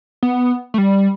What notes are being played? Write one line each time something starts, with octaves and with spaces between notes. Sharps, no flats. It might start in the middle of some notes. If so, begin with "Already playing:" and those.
B3
A3
G3